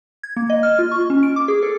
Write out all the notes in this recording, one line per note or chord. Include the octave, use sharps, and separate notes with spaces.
G#6
A#3
D#5
F6
F4
C#6
C#4
D7
D6
G#4
A4